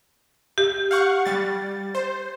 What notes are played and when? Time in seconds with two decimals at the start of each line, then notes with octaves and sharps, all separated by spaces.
0.58 G4
0.91 F5 F#5 C#6
1.25 G3 A6
1.95 C5